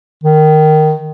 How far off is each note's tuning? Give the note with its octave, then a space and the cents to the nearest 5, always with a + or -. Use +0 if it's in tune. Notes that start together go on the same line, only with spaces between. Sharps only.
D#3 -10